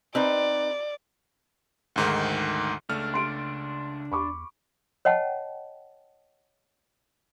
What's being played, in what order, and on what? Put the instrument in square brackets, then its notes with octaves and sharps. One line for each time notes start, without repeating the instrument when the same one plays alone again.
[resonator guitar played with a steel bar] C4 D#4 B4 [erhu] D5
[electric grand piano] D2 G#2 D#3
[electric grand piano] C#2 A3 F6 [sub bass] C#3 [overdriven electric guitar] D4
[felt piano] C6 D7
[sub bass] E2 [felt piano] B5 C#6 D6
[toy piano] C#5 D#5 F#5 G5 A5